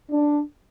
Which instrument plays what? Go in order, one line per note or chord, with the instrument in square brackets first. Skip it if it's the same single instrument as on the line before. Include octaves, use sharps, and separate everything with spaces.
[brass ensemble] D4